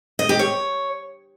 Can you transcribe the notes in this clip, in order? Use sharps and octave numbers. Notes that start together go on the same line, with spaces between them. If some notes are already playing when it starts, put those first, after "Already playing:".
D#5
G4
C#5